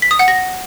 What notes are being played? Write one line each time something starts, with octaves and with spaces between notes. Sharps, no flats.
B6
D#6
F#5
A#6